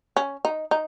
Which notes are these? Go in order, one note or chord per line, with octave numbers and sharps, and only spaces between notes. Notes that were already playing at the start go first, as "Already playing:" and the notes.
C#4
D#4
D#4